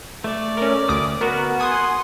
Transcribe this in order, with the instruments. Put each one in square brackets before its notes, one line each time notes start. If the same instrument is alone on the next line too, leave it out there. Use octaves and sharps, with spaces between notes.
[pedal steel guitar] A3 [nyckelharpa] D5
[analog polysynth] C#4 A#4
[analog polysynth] D2 D6 [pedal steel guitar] D#6
[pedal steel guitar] B3 F#4 [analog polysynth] A#4
[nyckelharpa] F#5 C6 [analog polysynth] G#5 D#6